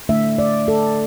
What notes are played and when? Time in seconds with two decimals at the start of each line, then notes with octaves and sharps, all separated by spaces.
0.09 D3 A3 D4 E5
0.39 D5
0.68 A4